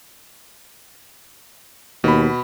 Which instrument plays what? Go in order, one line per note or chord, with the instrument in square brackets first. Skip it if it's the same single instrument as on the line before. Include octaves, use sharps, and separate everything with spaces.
[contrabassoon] D#2 [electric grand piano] B2 B5